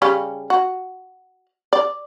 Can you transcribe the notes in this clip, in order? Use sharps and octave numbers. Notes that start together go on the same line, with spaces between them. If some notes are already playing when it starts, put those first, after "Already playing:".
C#3 G3 C#4
F#4
D5